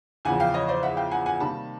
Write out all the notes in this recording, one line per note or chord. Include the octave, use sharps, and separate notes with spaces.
E2 C#3 F3 F#5 G#5
F5 G5
C#5 D#5
C5 D5
E5 F#5
F5 G5
F#5 G#5
F#5 G#5
C3 D#3 G3 A#3 A5 B5